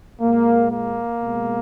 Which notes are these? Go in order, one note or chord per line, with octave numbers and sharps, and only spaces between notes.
A#2 G#3 A#3
A#3
B2 G#3